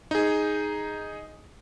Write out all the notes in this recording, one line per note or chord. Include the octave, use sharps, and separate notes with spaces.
D#4 G#4